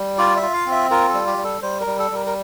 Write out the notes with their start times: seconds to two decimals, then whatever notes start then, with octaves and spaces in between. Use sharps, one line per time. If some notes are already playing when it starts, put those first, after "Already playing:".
Already playing: G3
0.18 F4 D5
0.37 E5
0.42 F4
0.53 F5
0.67 C4 E5
0.90 F4 A#4
1.08 A4
1.14 G3
1.27 G4
1.38 G3
1.44 A4
1.62 G3 C5
1.81 A#4
1.87 G3
1.99 A4
2.11 G3 A#4
2.27 A#4